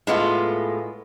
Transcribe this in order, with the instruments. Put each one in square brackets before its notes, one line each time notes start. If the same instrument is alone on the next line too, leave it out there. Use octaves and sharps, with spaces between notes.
[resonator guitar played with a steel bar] A2 G#3 B3 F4